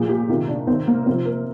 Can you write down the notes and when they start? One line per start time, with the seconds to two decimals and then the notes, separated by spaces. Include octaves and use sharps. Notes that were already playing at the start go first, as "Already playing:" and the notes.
Already playing: A#2 F3 G#4
0.09 G4
0.29 C3 D#3 F4
0.48 D4
0.67 C3 D#3 C4
0.88 A#3
1.06 C3 F3 C4
1.25 A#4